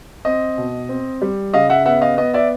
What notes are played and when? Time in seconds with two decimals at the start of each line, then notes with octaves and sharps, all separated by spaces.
0.25 C4 D#5
0.57 B2
0.89 C4
1.22 G3
1.53 C#3 D#5 F5
1.70 E5 F#5
1.85 B3 E5 F#5
2.02 D#5 F5
2.17 B3 D#5
2.34 D5 E5